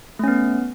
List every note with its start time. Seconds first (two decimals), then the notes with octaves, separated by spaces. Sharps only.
0.19 A3
0.24 C#4
0.28 B3